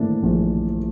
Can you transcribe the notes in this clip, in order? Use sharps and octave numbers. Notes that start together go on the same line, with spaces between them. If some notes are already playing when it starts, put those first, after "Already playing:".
Already playing: A2 A#3 D4
A#1